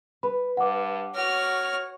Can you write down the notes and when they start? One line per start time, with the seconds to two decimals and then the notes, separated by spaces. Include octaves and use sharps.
0.23 B4 B5
0.57 G2 F#5 D6
1.15 F#4 C#5 F6